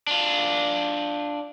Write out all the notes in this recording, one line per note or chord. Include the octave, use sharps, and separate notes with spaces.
D4 F4